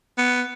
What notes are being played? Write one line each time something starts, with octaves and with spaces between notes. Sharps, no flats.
B3